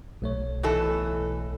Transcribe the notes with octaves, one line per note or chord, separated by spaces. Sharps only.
B1 A3 C#5
B2 E3 A4